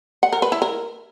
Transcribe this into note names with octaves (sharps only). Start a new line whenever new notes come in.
F#5
A#4
B4
E4
A#4